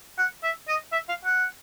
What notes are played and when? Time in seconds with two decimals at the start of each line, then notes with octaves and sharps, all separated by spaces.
0.18 F#5
0.43 E5
0.68 D#5
0.92 E5
1.09 F5
1.25 F#5